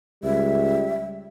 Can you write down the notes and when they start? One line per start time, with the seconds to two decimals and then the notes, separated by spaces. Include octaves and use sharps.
0.24 C#2 G3 E5